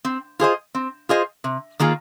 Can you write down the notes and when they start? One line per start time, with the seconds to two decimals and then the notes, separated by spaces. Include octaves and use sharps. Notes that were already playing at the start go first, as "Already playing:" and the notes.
0.05 C4
0.39 F4 G#4 C5 D#5
0.75 C4
1.09 F4 G#4 C5 D#5
1.44 C3
1.79 D#3 A#3 F4 G#4